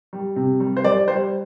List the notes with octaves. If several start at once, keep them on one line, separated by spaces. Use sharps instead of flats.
G3
C3
G3
C5
G3 D5
G3 C5